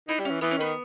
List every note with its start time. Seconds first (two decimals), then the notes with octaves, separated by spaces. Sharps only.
0.09 D#4 E4
0.19 G3
0.25 C#4
0.30 E3
0.41 E3 B3
0.51 C#4
0.58 D#3 B3